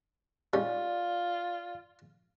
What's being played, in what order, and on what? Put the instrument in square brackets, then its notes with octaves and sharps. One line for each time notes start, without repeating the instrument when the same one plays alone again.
[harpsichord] G3 C#4 D#4 [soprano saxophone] F4 [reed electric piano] D5